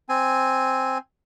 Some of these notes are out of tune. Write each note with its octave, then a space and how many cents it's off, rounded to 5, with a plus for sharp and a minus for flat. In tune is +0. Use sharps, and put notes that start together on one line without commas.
C4 +0 G#5 +0